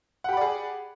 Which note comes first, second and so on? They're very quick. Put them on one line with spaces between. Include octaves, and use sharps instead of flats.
F#5 G4 B5 D5 G#4